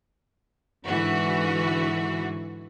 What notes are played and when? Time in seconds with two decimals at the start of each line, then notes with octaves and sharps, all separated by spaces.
0.86 G#2 D3 E3 F#4